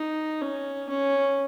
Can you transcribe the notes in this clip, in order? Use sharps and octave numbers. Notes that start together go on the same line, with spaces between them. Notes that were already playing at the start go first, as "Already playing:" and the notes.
Already playing: D#4
C#4
C#4